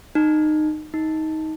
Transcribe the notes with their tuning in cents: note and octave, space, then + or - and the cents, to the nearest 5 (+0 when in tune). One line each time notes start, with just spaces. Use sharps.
D#4 -20
D#4 +20